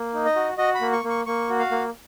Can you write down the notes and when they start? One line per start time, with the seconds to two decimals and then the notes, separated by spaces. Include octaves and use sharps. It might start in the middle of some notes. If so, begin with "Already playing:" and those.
Already playing: A#3
0.14 D#4
0.25 D#5
0.36 F#4
0.58 F#4 D#5
0.75 B5
0.81 A#3
0.92 C#6
1.04 A#3
1.09 C#6
1.26 A#3 C#6
1.49 F#4
1.59 F5
1.71 A#3